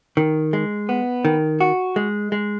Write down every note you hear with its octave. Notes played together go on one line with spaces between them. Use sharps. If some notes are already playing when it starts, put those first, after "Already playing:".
D#3
G#3
B3
D#3
F#4
G#3
G#3